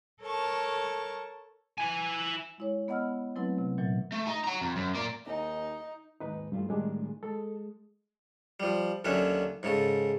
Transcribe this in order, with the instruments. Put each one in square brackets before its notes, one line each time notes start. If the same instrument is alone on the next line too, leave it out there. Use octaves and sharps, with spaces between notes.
[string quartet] A4 A#4 C#5 A5 C#6
[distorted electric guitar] E4 G#5
[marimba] G#3 E4 C#5
B3 D#5 F#5 B5 E6 F6
F#3 A3 C4 E4 B4
C3
A#2 E3 F#3
[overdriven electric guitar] A3
D#4
F#5 A#5
F2
F#2
A#3 D5
[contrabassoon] D#2 [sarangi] D#4
[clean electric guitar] D#2 G#2 [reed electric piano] D#4 B4
[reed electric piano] G2 [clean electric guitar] E3 A3 F4
[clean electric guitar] A2 D#3 G#4 [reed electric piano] G3 G#3 D4
[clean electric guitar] G#3 [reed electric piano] A4
[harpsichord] F3 G3
D#2 D3 F#3 C#4 E5
G#2 C#3 A4